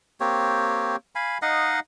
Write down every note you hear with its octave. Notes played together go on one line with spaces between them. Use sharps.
A#3 C4 G4 C#5
F5 G#5 B5
D#4 D#5 F5 F#5